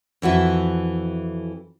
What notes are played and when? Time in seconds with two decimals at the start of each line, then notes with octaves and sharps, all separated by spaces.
0.22 F2 E3 F#4 E5